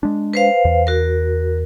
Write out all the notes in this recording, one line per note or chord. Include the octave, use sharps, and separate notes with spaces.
G#3 D4
B4 C5 F5
E2
F#4 A#4